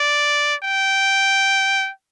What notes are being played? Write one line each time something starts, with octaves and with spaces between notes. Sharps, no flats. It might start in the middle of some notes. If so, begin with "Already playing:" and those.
Already playing: D5
G5